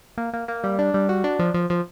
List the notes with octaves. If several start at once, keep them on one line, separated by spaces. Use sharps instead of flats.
A#3
A#3
A#3
G3
D4
G3
F#4
D4
F3
F3
F3